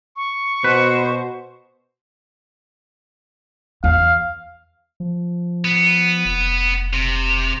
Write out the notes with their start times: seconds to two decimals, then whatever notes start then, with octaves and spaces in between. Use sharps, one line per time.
0.16 C#6
0.64 B2 F#4 B4 C5
3.84 E2 F5
5.00 F3
5.65 B3
6.25 F1
6.93 C3